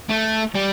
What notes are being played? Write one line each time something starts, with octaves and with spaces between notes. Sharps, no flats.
A3
G3